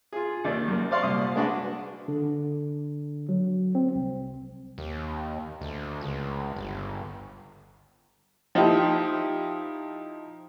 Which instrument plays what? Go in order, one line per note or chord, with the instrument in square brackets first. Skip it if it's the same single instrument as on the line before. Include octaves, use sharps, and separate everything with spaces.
[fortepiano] F4 G#4
D#2 D#3 D5
F#2 A#4
C5 D5 F5 C6 C#6
C2 A#2 D#6
G#3 D4 F#4 B4
[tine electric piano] D3
F#3
C4
C2
[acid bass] D#2
D2
C#2
G1
[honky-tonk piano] F3 D#4 E4 G4